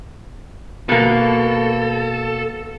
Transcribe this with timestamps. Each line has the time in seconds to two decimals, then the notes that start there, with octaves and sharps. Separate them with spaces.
0.89 B2 A#3 A4